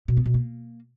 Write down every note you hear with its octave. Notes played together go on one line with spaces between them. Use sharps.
B2
B3
B2
A#3